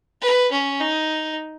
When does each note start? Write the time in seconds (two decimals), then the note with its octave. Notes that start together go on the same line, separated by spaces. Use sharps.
0.21 B4
0.51 C#4
0.80 D#4